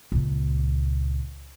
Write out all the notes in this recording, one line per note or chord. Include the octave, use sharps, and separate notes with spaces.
C#2 A#2